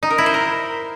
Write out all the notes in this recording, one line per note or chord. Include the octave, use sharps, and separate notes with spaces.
D#4
A#4
E4
C5
A#4